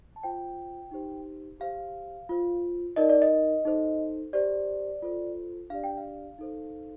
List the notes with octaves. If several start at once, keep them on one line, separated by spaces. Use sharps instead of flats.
A5
F4 C5 G5
D#4 G4 C5
G4 C5 F5
F4 C5
D#4 A#4 D5 D#5
D5
D#5
D#4 A4 C5
G4 C5 D5
F4 A4 C5
D4 G4 D5 F5
G5
F5
D#4 A4 C5